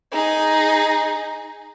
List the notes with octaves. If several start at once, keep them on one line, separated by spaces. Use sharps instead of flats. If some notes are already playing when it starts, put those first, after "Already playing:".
D#4 G#4